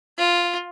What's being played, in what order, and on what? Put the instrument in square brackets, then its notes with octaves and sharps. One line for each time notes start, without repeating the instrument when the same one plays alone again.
[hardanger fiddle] F4